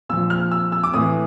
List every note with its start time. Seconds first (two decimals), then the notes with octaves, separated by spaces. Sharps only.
0.09 A#2 E6
0.13 F3
0.30 F6
0.51 E6
0.72 E6
0.84 D6
0.94 A2 E3 D#6